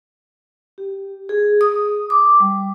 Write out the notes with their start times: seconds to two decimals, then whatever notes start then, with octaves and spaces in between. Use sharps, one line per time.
0.78 G4
1.29 G#4
1.61 D#6
2.10 D6
2.40 G3